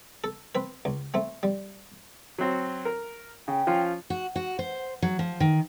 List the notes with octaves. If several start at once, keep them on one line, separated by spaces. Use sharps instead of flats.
A4
C4 B4
C#2
A3 C4
G3
F#3 C4 F#4
A#4
C#3 G5
F3 C#4 F4
F#4
F#4
C5
F#3
F3
D#3